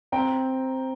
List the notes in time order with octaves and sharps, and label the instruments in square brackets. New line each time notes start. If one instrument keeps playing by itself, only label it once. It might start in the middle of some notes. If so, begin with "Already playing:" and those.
[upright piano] C4 G5 A#5